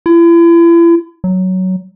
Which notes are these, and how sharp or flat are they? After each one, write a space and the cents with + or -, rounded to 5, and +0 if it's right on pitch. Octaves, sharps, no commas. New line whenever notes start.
E4 +40
F#3 +10